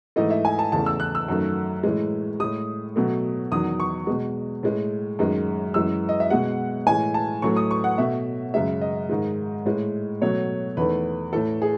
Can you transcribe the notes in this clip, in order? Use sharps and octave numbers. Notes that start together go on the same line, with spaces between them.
G#2 E3 A3 D#5
E5
G#5
A5
E2 C#3 E3 A3 A5
E6
F#6
E6
F#2 D#3 F#3 A3
A2 E3 G#3
A2 G#3 D#6
B2 F#3 A3
E2 D#3 F#3 D#6
C#6
B2 G#3
A2 G#3
F#2 D#3 G#3
F#2 E3 G#3 E6
D#5
E5
B2 G#3 F#5
A2 E3 G#3 G#5
A5
A2 F#3 A3 C#6
D#6
C#6
F#5
B2 A3 E5
F#2 C#3 G#3 E5
D#5
G#2 D#3 G#3
A2 G#3
B2 F#3 A3 C#5
E2 D#3 A3 B4
A2 E3 A3 A4
G#4